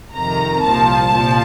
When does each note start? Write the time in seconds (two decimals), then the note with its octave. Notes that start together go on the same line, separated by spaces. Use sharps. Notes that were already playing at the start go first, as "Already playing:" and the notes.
0.14 F2 C3 D#3 A#5
0.63 C2 A#2 F3 A5
1.11 C2 A#2 F3